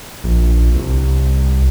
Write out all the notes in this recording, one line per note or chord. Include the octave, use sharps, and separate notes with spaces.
A#1
C2